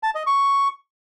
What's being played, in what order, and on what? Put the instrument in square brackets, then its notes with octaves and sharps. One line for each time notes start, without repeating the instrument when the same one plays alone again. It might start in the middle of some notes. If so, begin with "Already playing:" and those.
[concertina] A5
D#5
C#6